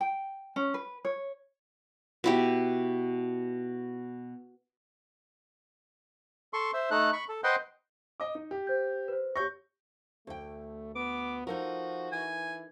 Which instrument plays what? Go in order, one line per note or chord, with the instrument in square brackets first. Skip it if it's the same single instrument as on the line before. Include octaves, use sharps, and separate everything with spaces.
[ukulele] G5
C#4
B4
C#5
[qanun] B2 E4 G4
[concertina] A4 C6 C#6
C5 E5
A3 D#4 A4 F#6
B5 C#6
A4
B4 C5 D#5 F#5 G5 C6
[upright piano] D#5 D6
D#4
G4
[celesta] C5 G6
B4 C5
[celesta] G4 C#5 A#6 [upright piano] C#6 G6
[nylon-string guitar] D2 G5 [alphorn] A3
[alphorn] B3 [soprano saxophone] D6
[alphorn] F3 [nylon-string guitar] D#4 A4 A#4 [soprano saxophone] F#4
[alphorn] E3 [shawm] G#5